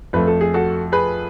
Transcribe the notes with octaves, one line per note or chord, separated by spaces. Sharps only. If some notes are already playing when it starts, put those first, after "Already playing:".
F2 F3 A3 B4
A4
G#4
F#4 A4
G#4 B4